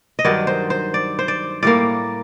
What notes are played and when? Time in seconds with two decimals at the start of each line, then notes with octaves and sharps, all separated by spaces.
0.19 D#5
0.25 G2 D#3 F#3 D5
0.47 C5
0.70 C5
0.94 D5
1.19 C5
1.28 D5
1.63 A2 G3 A#3 D5